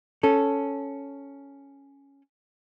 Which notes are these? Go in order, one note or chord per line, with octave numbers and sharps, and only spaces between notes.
C#4 A4